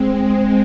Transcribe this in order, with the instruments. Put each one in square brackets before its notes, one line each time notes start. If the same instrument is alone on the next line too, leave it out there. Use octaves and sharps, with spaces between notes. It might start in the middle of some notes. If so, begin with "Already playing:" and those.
Already playing: [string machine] G#3 C4
G#3 C4